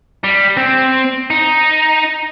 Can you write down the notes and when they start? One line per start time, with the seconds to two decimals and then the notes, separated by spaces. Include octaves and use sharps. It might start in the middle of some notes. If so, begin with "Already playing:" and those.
0.24 G3
0.57 C4
1.30 D#4